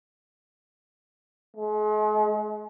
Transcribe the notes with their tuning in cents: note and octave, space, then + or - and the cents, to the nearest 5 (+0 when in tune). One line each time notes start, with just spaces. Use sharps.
G#3 +40